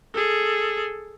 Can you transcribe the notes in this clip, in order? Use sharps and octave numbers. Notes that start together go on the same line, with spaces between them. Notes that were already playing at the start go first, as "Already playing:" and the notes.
G#4 A4